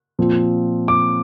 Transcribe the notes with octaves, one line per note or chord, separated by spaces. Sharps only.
A#2 F3 C4
D6